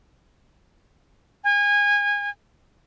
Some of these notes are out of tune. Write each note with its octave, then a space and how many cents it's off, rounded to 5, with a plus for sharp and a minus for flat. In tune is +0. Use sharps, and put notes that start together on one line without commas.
G#5 -25